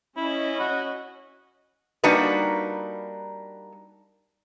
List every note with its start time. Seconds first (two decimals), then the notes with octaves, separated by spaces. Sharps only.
0.17 C#4 E4 D#5
0.60 F#4
2.04 G3 A#3 D4 D#4 F#4 B4